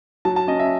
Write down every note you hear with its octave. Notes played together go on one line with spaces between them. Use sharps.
F#3 A5
A5
C#4 D#5
E5